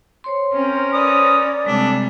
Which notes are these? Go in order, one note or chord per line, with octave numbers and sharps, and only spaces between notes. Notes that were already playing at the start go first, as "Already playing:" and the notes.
C5 C#5 C6
C4 C#4 A#4
B4 D5 D#6
C3 G3 G#3 D4 A4